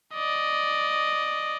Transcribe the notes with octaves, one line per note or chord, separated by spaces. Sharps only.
D5 D#5